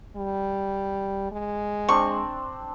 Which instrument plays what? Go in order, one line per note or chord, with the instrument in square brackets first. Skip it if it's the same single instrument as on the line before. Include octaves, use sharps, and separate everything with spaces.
[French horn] G3
G#3
[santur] C4 D4 C6 [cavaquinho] C#6